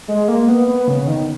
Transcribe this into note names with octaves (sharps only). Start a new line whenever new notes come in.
G#3
A#3
B3
B3
C#3
C#3
D#3